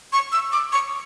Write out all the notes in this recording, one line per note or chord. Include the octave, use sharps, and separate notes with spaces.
C#6
E6
D6
C#6